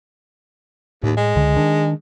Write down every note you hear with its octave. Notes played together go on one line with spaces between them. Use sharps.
D#2 A2
G#3
C#2 D3
D#3 D4